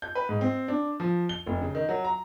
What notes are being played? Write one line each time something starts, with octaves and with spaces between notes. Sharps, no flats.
G6
B4
G#2
C4
D4
F3
G7
F1
C#3
D#3
F#3
A#5